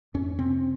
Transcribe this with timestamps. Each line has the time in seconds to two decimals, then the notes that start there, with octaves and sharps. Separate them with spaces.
0.14 F2 C#4
0.39 C3 C4